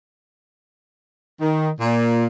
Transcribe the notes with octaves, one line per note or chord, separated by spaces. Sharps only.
D#3
A#2